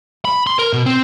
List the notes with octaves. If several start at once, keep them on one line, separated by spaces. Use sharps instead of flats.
B5
C6
A#4
B2
C4